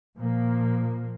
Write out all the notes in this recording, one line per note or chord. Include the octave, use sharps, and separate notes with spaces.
A#2 F3 A#3